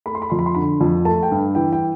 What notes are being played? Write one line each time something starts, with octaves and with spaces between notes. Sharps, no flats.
A3 B5
C6
B5
F2 C6
B5
C6
D3 B5
F2
A3 A5
G5
G2
E3 G5
G5